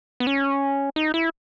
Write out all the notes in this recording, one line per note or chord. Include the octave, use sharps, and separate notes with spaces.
B3
C#4
D#4
E4